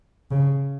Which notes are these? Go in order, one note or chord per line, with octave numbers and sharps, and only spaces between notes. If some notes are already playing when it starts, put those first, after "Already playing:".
C#3